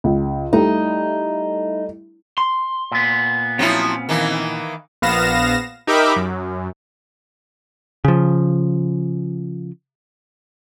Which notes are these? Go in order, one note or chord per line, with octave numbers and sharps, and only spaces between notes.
C#2
G3 A3 D#4 E4
C6
A#2 B3
F3 F#3 C4 C#4 E4
D#3 E3 A#3
A#1 B3 F5 A#6 E7
D#4 G4 A#4 E5 B5 D6
F#2
C#3 F3